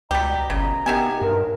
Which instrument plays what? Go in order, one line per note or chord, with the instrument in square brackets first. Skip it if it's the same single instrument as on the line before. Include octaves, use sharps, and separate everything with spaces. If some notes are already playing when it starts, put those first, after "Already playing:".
[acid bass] C#2 [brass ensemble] B2 D#5 A#5 [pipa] G3 G4
[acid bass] G1 [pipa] C#3
[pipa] D#3 E5 G#5 [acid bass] B3 [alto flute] G4
[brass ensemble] B1 [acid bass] G2 [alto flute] A#4